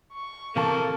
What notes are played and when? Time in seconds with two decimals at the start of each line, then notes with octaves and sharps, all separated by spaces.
0.13 C#6
0.56 C3 E3 A#3 A4 A5